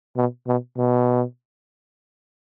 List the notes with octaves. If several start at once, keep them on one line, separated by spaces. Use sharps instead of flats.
B2
B2
B2